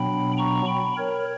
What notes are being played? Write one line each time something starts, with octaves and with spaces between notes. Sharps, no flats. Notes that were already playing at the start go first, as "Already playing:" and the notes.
Already playing: B2 F#3 B3 D4 G5 B5
A#5 C#6
G5 B5
A#4 C#5